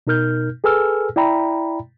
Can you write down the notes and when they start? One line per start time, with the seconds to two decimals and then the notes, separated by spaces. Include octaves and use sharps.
0.07 B2 D#4 A#4 F6 G6
0.64 G#4 A4 B4 G#5 E6 F6
1.16 E4 D5 E5 G5 A#5 B5